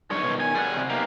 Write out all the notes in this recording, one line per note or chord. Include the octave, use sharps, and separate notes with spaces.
B1 G2 F#3 D#4 C#5
B2 D#3
G#5
G3 G#4 F#5
C3
A#3 B3 D#4 G4